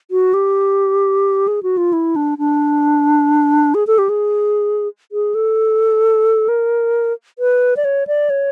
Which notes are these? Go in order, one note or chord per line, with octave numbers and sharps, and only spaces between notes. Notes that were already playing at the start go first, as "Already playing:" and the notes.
F#4
G4
G#4
F#4
F4
E4
D4
D4
G#4
A4
G4
G#4
G#4
A4
A#4
B4
D5
C#5
D5
C#5